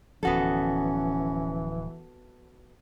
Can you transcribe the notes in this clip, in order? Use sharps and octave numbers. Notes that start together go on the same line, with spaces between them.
D1 E3 F3 B3 C#4 F#4 A4